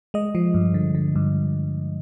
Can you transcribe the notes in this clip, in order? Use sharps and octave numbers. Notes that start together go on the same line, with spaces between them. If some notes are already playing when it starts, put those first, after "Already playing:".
G#3 D#5
F3
G2
D3
D3
G2